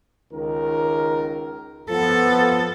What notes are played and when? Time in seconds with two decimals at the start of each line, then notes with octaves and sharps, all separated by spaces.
0.34 C#2 D#3 A#4
1.91 F3 B3 A4